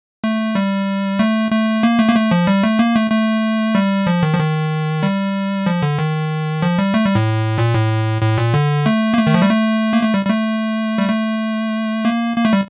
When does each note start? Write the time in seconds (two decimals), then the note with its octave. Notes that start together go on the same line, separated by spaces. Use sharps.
0.24 A3
0.55 G3
1.19 A3
1.51 A3
1.83 A#3
1.99 A3
2.08 A#3
2.15 A3
2.31 F3
2.47 G3
2.63 A3
2.79 A#3
2.95 A3
3.11 A3
3.75 G3
4.07 F3
4.23 D#3
4.34 F3
4.39 D#3
5.03 G3
5.66 F3
5.82 D3
5.99 D#3
6.62 F3
6.78 G3
6.94 A3
7.05 G3
7.15 A2
7.58 A#2
7.74 A2
8.22 A2
8.38 A#2
8.54 D3
8.86 A3
9.14 A#3
9.18 A3
9.27 D#3
9.34 F3
9.42 G3
9.50 A3
9.93 A#3
10.03 A3
10.14 G3
10.25 G3
10.29 A3
10.98 G3
11.09 A3
12.05 A#3
12.37 A#3
12.45 A3
12.53 G3